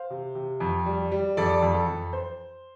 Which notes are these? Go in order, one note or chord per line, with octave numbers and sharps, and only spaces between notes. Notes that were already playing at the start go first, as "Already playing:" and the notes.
Already playing: C5 F5
C3
C3
F2
G3
G3
F2 A4 D5
F2
A4
F2
C5